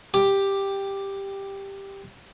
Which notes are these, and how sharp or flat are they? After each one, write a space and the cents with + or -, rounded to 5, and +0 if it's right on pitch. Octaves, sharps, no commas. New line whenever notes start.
G4 +5